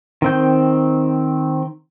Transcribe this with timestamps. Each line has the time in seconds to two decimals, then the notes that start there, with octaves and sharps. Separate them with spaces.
0.22 D#3 C4 G6